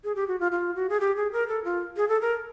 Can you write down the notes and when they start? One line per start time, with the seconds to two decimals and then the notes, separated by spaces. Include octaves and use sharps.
0.04 G#4
0.16 G4
0.28 F#4
0.40 F4
0.52 F4
0.76 F#4
0.90 G#4
1.00 G4
1.16 G#4
1.32 A#4
1.48 A4
1.64 F4
1.97 G#4
2.09 A4
2.21 A#4